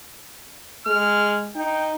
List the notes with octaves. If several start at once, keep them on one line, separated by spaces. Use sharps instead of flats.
G#3 F6
D#4 G5